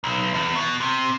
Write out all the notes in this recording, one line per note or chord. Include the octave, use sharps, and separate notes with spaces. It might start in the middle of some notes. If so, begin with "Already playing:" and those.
B1
E2
B2
C3